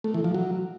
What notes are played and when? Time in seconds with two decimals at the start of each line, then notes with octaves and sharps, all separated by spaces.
0.04 A3
0.14 E3
0.24 F3
0.34 F#3